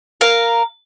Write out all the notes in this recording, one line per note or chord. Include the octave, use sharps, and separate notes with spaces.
A#4 F5